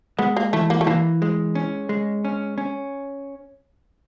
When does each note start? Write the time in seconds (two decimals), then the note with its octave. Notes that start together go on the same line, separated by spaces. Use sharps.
0.19 G#3 B3
0.37 A#3
0.53 E3 A3
0.70 A#3
0.81 A3
0.87 E3 A#3
1.22 G#3
1.55 C#4
1.89 G#3
2.25 C#4
2.58 C#4